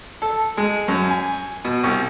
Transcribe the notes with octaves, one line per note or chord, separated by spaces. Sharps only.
A4
G#3
F#2
G#5
B2
C2